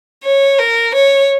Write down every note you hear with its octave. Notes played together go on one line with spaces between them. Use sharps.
C#5
A#4
C#5